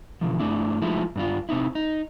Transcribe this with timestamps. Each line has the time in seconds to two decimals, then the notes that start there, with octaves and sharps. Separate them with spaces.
0.21 B2 D3 E3 F3
0.39 G2 A3 D4 E4
0.82 F3 G#3 A3 D#4 E4
1.16 G2 D4 F4
1.49 C3 C4 D#4 E4
1.75 D#4